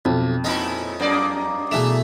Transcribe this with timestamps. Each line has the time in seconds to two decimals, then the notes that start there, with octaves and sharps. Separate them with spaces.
0.05 B1 F2
0.44 A#2 G#3 C#4 D#4 E4
1.00 F#2 A#3 D5
1.71 B2 E3 A3 G#4 E7